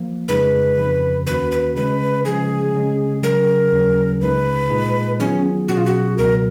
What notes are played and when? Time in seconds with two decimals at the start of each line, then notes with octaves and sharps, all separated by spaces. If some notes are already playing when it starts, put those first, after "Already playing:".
Already playing: F3 A#3
0.28 F2 C#3 G#3 D#4 G#4 B4
0.78 F2 C#3 F3
1.26 D#2 D#3 A#3 C#4 F#4 B4
1.52 B4
1.75 C#3 G#3 C#4 B4
2.25 C#3 F3 G#3 C#4 G#4
2.74 C#3 G#3 C#4
3.22 C#3 F#3 C#4 A#4
3.72 D#2 C#3 F#3 C#4
4.21 C#2 C#3 G#3 D#4 B4
4.70 A#2 G#3 D#4 G#4
5.19 D#3 F#3 B3 C#4 F4 G#4
5.68 B2 F#3 C#4 F#4 G#4
5.77 F4
5.86 F#4
6.18 C#2 B2 F#3 A#4